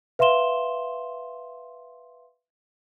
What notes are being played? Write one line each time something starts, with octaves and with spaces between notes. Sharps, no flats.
B4 E5 F5 C6 E7 G7